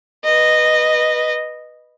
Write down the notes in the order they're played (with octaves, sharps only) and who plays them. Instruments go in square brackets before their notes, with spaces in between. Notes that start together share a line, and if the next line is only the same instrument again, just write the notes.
[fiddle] B4 D#5